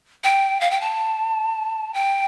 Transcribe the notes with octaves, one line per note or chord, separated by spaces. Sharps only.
G5
F5
G5
A5
G5